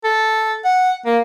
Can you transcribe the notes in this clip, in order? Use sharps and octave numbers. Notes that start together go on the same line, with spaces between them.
A4
F#5
A#3